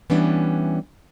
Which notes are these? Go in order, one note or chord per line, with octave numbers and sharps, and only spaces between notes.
E3 G3 B3 C#4 D4 E4